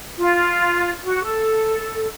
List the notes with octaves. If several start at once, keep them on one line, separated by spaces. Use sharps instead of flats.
F4
F#4
A4